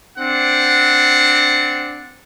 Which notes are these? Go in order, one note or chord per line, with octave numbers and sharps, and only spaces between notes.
C4 D4 F#5